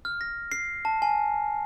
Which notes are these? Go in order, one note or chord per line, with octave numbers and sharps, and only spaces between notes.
F6
A#6
C7
A5
G#5